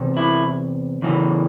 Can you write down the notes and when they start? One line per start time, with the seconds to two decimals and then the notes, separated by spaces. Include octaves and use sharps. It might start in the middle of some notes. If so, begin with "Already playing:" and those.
Already playing: E2 C3
0.16 E4
1.02 E2 C#3 E3